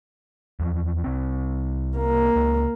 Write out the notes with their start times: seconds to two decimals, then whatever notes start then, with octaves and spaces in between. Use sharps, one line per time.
0.60 E2 F3
1.04 C2 C4
1.97 A#3
2.36 C#2